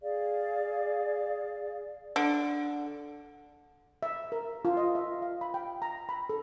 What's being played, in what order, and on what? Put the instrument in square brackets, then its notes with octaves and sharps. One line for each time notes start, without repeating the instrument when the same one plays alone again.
[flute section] G#4 D5 F5
[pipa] D3
[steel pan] E5
A#4
F4
D#5
E5
F5
B5
G5
A#5
B5
A4